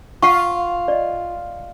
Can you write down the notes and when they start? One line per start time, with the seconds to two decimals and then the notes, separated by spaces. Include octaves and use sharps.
0.22 F4 F5 F#5 C#6
0.88 D5 D#5